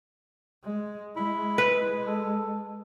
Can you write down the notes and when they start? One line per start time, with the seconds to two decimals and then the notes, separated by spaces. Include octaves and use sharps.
0.64 G#3
1.16 G#3 E4
1.58 B4
2.07 A4